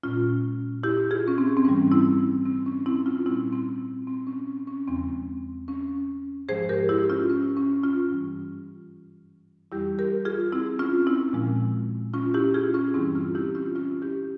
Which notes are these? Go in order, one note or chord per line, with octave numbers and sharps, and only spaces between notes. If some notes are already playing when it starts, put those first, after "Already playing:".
A#2 G#3 C#4 F4
E4 G4
F4 G#4
C#4
C4
C4
G#2 E3 G3 C#4
C4 E4
C4
C#4
C4 E4
C#4 F4
A#2 G3 C4 E4
C4
C4
C#4
C#4
C#4
E2 C#3 F3 G#3 C4
C#4
G#2 F3 G#3 G#4 C5
G4 A#4
E4 G4
C#4 F4
C#4
C#4
C#4 F4
G2 E3 G3
F2 E3 G3 E4 G4
G4 A#4
F4 G#4
C4 E4
C#4 F4
C4 E4
A#2 F3 G#3
C#4 F4
E4 G4
F4 G#4
C#4 F4
G2 E3 G3 C4 E4
C#4 F4
E4 G4
C#4 F4
C#4 F4
E4 G4